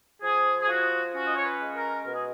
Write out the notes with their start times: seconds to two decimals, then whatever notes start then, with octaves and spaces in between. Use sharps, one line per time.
0.22 F3 G#4
0.61 G#4
0.68 F4 F#4
1.14 C#4 F#4
1.27 D#5
1.36 C#5
1.45 B4
1.61 G#3
1.75 A#4
2.05 B2 A#4
2.15 G#4